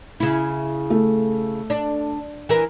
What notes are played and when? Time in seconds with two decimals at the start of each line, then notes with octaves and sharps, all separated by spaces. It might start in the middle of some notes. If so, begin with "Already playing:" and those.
0.20 C#3 E4
0.90 A3
1.70 D4
2.49 E3 A#4